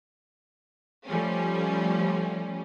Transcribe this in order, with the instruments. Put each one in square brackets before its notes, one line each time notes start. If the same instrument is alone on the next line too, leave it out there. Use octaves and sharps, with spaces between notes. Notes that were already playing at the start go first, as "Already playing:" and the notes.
[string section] F3 G3 A3 C#4